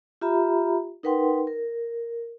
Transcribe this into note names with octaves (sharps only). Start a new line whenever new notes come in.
F4 G4 E5 A#5 B5
D#4 A#4 B4 F#5 G5 C6
A#4